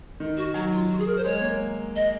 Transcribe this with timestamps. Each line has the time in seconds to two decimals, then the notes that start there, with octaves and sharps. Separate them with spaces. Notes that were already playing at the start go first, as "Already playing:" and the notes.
0.20 D#3
0.37 F#4
0.54 F#3 D#4
0.72 F4
0.90 F#4
0.99 G#4
1.07 A#4
1.16 C5
1.24 G#3 C#5
1.42 A#3
1.95 D#5